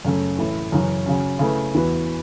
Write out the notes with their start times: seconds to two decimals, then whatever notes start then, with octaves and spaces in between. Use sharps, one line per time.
0.05 F#2 C#3 A3 C#4 A4
0.38 A2 E3 A3 E4
0.72 F#2 C#3 E3
1.06 C#3 F#3 C#4
1.39 C#3 A3 E4 B4
1.74 E2 E3 B3 F#4 B4